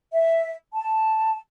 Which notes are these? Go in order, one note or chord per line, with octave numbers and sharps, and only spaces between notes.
E5
A5